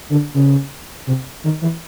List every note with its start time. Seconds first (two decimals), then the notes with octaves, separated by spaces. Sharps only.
0.10 D3
0.34 C#3
1.07 C3
1.44 D#3
1.62 E3